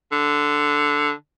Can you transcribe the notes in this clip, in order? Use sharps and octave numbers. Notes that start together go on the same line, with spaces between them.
D3